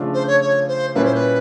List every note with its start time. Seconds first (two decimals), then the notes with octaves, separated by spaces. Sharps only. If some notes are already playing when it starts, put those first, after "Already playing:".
Already playing: C#3 F3 A3 D4 F4
0.14 C5
0.27 C#5
0.41 C#5
0.68 C5
0.95 A#2 G3 A#3 C#4 E4 B4
1.05 C5
1.15 B4